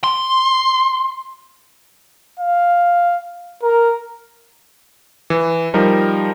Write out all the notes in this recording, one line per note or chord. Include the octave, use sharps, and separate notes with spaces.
C6
F5
A#4
E3
F3 G3 D#4 A#4